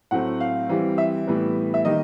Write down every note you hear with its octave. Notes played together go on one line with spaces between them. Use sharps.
A2 F#3 A3 C4 F#5
F5
E3 G3 C4
E5
A2 E3 G3 B3
E5
D#3 G3 A#3 D#5